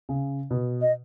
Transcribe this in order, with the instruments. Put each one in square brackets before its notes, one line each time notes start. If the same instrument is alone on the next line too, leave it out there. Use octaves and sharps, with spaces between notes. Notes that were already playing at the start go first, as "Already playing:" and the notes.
[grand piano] C#3
B2
[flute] D#5